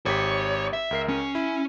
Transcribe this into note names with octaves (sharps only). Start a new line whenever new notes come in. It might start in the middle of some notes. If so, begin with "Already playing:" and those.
G#1 G4 C#5 B6
E5
C#2 A#4 C7
C#4
E4